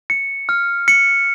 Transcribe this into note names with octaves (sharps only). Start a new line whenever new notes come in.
C#7
F6
C#7